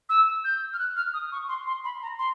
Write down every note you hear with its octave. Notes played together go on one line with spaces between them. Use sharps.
E6
G6
F6
F#6
F6
D#6
C#6
C6
C6
B5
A#5
C6